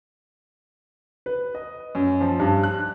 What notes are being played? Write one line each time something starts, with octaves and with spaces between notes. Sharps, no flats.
B4
D#5
F#2
F3
G2
F#6